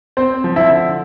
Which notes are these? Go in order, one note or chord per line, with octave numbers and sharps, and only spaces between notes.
C4 C5
F3
E4 E5
D3